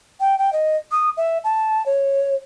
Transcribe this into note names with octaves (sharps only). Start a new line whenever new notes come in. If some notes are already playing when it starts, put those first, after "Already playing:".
G5
G5
D#5
D#6
E5
A5
C#5